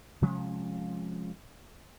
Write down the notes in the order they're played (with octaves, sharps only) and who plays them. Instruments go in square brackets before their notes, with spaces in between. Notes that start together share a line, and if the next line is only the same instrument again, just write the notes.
[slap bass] C3 F3 G#3 C#4